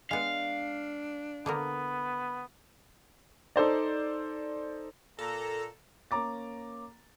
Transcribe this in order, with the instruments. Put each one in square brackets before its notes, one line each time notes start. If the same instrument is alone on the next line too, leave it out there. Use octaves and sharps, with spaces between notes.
[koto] G#3 B3 [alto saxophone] D4 [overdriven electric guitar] F5
[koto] D3 A#3 A#4 [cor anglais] B3
[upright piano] D#4 A4 C5 D5
[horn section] A#2 A#3 A#5 [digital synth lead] A4
[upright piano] A#3 C#4 A#5 D6 A6